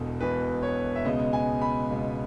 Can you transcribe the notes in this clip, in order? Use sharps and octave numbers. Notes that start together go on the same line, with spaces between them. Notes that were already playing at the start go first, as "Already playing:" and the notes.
Already playing: E1 E2 B2 A4
E1 E2 B2 B4
C#5
E5
C#2 B2 G#3 B3 D#5
G#5
B5
C#2 B2 G#3 B3